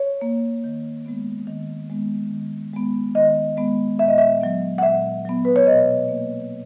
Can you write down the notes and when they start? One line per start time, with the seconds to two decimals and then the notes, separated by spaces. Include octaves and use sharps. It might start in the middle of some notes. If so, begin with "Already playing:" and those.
Already playing: C#5
0.21 A#3
0.64 D#3
1.06 G#3 B3
1.47 D#3
1.90 G#3 B3
2.31 D#3
2.73 G#3 B3
3.15 D#3 D#5
3.57 G#3 B3
3.99 A#2 E5
4.08 D#5
4.18 E5
4.41 F#3 B3
4.78 F#5
4.83 A#2 E5
5.25 F#3 B3
5.45 B4
5.56 C#5
5.66 B2 D#5
6.08 A#3